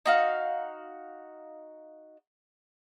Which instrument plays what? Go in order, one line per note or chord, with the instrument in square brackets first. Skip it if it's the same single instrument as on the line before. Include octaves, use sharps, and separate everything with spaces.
[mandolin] D#4 F#4 F5